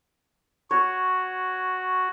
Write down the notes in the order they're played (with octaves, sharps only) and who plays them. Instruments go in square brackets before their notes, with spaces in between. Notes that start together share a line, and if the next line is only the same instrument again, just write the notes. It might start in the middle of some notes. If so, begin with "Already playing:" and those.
[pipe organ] F#4 [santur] C#5